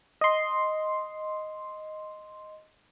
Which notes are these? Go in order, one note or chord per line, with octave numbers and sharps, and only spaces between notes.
D#5 C6